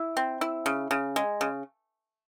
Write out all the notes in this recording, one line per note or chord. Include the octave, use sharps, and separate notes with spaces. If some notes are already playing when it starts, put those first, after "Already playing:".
Already playing: E4
C4
E4
C#3
C#3
G#3
C#3